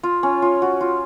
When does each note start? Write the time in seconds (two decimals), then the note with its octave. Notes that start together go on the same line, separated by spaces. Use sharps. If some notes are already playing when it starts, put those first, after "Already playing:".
0.03 F4
0.23 C#4
0.42 F4
0.62 F#4
0.81 F4